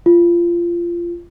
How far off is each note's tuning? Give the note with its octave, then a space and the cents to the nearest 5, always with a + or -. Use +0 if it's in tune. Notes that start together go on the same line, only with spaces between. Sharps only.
F4 -20